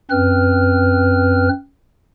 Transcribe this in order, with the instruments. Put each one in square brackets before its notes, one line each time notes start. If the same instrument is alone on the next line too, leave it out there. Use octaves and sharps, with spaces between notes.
[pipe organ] F#2 C4 B4 F6